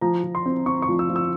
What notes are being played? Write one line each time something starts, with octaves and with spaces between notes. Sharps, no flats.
F3 A#5
F3
C6
C4
C4 C#6
C#6
F3
E6
F3
E6